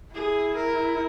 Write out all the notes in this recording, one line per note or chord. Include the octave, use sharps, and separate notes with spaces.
E4 G#4
A#4